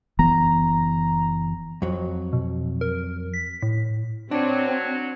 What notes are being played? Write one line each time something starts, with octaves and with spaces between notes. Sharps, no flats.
F#1 E3 B3 A#5
F2 F#3
B2
A#4
B6
A2
F#3 C4 D4